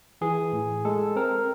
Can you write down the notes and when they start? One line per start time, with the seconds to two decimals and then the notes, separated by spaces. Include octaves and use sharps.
0.21 E3 G#4
0.53 A2
0.85 G#3 A4
1.16 C4 A#4